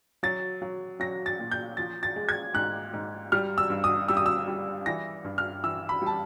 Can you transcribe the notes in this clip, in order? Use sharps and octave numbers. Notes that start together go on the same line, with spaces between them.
F#3 A6
F#3
F#3 A#6
A6
A#2
G6
F3 A6
A6
G#3
G#6
G#2 F#6
G#2
G3 F6
E6
G2
D#6
G3 E6
D#6
E6
G3
E3 A#6
G2
F6
E3 E6
B5
G3 A5